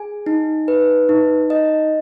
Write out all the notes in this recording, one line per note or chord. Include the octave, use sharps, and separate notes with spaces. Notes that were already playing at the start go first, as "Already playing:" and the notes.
Already playing: G#4 G#5
D#4
B4
D#4
D#5